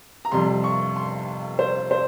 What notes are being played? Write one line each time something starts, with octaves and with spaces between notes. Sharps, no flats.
A#5
F2 C3 G3 C6
C#6
C6
C5
C5